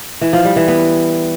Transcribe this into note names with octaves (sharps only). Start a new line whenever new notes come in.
E3
F3
G3
E3
B3